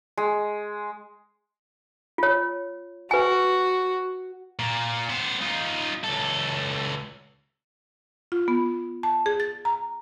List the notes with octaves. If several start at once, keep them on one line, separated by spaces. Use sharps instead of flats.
G#3
F4 C#5
F#4 B4 G#5
A#2
B3 C5
D#4 F4
C#2 A4
F4
B3
A5
G#4
A6
A#5